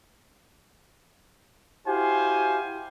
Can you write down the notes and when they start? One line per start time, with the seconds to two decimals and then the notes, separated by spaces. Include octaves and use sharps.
1.86 E4 F#4 G4 C5 F5 G#5